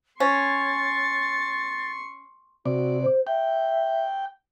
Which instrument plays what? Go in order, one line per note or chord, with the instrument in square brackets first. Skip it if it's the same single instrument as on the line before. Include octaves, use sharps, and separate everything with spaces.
[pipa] C#4 [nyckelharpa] C6 C#6 [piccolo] A6
[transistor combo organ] C3 D5 [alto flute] F#4
[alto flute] C5
[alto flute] E5 [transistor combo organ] G5